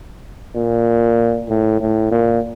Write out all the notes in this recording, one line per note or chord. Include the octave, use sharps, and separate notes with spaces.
A#2
A2
A2
A#2